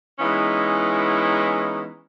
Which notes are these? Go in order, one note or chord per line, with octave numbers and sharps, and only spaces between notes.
E3 G#3 B3 C#4 D#4 E4